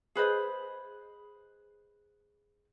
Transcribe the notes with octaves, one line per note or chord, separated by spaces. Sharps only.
G#4 B4 C5 D#5